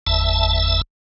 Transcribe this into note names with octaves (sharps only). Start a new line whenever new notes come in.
G1 E2 E5 A5